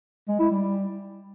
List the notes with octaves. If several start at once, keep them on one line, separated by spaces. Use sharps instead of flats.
G#3
E4
G3